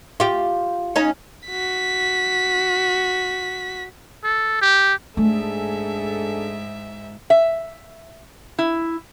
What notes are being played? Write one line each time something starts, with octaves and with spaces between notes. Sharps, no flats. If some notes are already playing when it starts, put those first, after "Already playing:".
F4 G4
C#4 D#4
F#4 B6
A4
G4
G#2 A3 D4 G#4 A4 E5
E5
E4